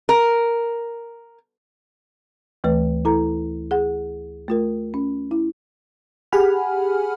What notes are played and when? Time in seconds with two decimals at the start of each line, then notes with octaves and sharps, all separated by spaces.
0.09 A#4
2.64 D2 E3 A3 B4
3.05 E4 A4 A#5
3.71 G#4 F#5
4.48 A3 F4 A#4
4.94 C#4
5.31 E4
6.32 G4 G#4 F#5 G#5 B5 F6